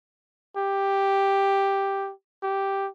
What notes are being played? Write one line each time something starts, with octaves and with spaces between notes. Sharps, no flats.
G4
G4